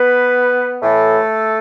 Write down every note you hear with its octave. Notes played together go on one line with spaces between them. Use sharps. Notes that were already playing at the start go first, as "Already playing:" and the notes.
Already playing: B3 B4
A2 E3 A3 A4